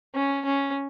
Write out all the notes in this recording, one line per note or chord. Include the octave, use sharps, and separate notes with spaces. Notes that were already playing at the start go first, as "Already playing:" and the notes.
C#4
C#4